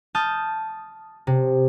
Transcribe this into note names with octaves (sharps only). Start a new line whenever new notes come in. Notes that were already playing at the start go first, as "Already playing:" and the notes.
A5 D#6 F6 G6
C3